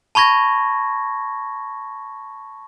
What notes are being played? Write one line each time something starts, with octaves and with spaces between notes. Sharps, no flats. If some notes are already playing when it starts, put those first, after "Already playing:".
A5 B5 C#6 G#6 A#6